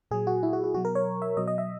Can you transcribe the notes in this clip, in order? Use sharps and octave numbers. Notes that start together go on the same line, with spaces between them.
A#2 F#3 G#4
F#4
E4
F#4
F#4
B2 F#3 F#4
A#4
C#5
E5
B2 F#3 D#5
D#5
E5